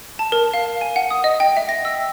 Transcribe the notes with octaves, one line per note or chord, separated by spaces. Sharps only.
A5
A#4
F5
G#5
F#5
D#6
D#5
G5
E5
A#6
E6